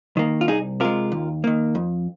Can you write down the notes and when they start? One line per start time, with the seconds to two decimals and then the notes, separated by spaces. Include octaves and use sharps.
0.17 D#3 A#3
0.41 F4
0.48 C2 D#4 G#4
0.80 C3 G#3 F4 A#4
1.12 D#2
1.44 D#3 A#3
1.75 F2